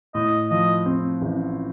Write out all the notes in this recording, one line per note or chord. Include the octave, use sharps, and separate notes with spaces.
A2 D#5
F3 D#5
C4
A1